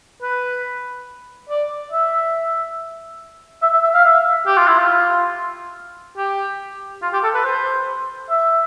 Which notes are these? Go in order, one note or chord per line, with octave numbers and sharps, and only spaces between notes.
B4
D5
E5
E5
E5
E5
F5
E5
G4
F4
E4
F4
G4
F4
G4
A4
B4
C5
E5